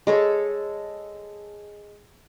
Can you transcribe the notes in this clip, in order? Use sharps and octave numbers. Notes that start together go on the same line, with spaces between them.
G#3 A4 C#5